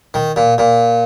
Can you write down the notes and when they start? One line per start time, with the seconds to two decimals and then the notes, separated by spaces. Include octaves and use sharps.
0.14 D#3
0.36 A#2
0.58 A#2